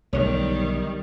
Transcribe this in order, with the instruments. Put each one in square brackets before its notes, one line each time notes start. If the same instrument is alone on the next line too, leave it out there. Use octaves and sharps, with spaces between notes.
[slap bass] B1 D3 [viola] D#3 G3 [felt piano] C#5